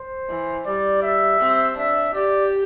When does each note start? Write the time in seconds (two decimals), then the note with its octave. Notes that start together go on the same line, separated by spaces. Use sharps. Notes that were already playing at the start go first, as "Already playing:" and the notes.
Already playing: C5
0.29 E3
0.66 G3 D5
1.03 E5
1.40 C4
1.77 D4 E5
2.14 G4 D5